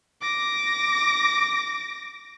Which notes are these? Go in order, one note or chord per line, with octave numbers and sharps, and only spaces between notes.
D6 A#6